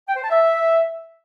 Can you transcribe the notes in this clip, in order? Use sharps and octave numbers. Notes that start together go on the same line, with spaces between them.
G5
C5
A5
E5